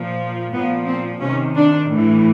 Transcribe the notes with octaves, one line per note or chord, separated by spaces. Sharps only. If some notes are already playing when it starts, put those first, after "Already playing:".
Already playing: A#2 F3
A#2 F3 B3
C4
C3 D#3 C#4
D4
A2 E3